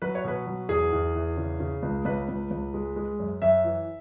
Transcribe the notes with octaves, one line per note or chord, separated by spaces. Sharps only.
F#3 B4
C#5
B2 B4
F#3
E2 G#4
E2
E2
C#3
C#3
C#2
C#2 B4
C#2
C#2
G#3
G#3
F#2
F#2 E5
E3